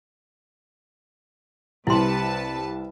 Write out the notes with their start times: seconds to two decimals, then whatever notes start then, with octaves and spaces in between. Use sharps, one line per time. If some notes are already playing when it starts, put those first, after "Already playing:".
1.87 C2 C3 E4 B4 A5 C6